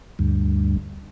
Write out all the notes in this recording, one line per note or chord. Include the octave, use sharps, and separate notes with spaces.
D2 G2